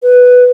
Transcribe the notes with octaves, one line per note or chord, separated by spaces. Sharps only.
B4